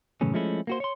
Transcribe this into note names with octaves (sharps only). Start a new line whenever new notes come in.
F#2 A2 C#3 E3 C#4
F3 G#3 A3 C#4 E4
A#3 F#4 C5
C#5 C6